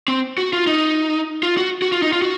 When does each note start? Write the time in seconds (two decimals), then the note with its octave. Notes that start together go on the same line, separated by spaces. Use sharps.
0.08 C4
0.38 F#4
0.53 F4
0.67 D#4
1.43 F4
1.57 F#4
1.82 F#4
1.92 F4
2.02 D#4
2.13 F4
2.22 F#4